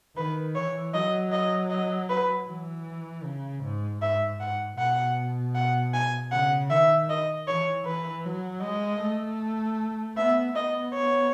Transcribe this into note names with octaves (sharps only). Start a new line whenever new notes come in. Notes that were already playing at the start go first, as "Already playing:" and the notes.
D#3 B4
E3 C#5
F#3 D#5
D#5
D#5
B4
E3
C#3
G#2
G#2 E5
G#2 F#5
B2 F#5
F#5
G#5
C#3 F#5
D#3 E5
D#5
E3 C#5
E3 B4
F#3
G#3 D#5
A3
B3 E5
B3 D#5
C#5